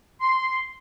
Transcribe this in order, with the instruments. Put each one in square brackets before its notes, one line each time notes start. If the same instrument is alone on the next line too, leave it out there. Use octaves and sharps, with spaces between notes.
[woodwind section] C6